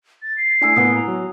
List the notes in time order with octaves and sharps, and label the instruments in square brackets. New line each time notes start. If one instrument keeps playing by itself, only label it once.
[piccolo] A6
C7
[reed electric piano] A3 D4 [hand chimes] E4 G#5 E6
[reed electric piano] A2 A#3 B3 [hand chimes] F#5 D#6
[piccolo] A#5
[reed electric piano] F#3